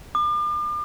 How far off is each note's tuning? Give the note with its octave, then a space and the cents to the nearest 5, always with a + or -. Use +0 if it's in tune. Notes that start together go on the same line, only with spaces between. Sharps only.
D6 +40